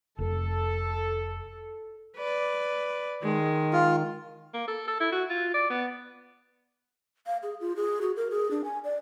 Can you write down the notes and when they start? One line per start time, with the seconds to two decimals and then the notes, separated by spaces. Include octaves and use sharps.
0.19 F1 A4
2.17 B4 D5
3.23 D#3 G#3
3.73 F4
4.54 A#3
4.67 A4
4.88 A4
5.00 E4
5.12 F#4
5.30 F4
5.54 D5
5.70 B3
7.27 F5
7.43 G#4
7.60 F4
7.76 G#4
8.02 F#4
8.16 A#4
8.31 G#4
8.51 D4
8.64 G#5
8.84 D5